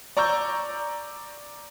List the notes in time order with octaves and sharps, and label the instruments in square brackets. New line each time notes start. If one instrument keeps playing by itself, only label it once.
[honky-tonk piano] D5 A#5 C#6 E6 G6